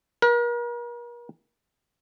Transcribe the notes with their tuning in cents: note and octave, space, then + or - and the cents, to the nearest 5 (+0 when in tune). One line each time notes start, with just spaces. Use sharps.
A#4 +40